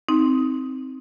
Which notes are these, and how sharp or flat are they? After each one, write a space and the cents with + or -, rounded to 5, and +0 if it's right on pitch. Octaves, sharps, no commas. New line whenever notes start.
C4 +0 D#4 +15